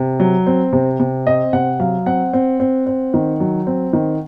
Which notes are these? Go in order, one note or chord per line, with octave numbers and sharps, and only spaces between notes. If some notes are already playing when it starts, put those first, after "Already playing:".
Already playing: C3
F#3
C4
C3
C3
C4 D#5
C3 F#5
F#3 F5
C4 F#5
C4
C4
C4
D#3
F#3
C4
D#3